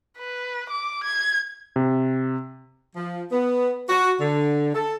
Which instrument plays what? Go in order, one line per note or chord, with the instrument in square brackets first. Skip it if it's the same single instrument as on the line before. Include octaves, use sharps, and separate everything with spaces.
[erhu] B4
D6
G#6
[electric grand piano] C3
[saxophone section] F3
B3
F#4
D3
A4